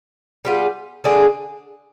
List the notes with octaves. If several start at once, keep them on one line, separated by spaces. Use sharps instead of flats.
G3 B3 F4 G#4
D3 G#3 D4 G#4